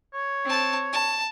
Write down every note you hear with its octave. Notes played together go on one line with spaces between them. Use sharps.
C#5
C4 A5
A5